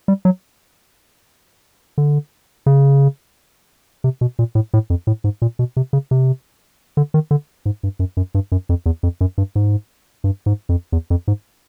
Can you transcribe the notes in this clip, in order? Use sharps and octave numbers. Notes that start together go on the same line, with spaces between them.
G3
F#3
D3
C#3
C3
B2
A#2
A2
A2
F2
A2
G#2
A#2
B2
C3
C#3
C3
D3
D#3
D3
G#2
G2
F#2
F#2
G2
F#2
F2
E2
F2
F#2
G2
G#2
G2
G#2
F2
E2
F2
G#2